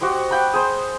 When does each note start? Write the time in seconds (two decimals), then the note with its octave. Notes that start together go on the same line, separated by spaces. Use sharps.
0.01 F#4 G4 C5 D#5
0.31 F#5 G5 B5
0.53 G#4 C5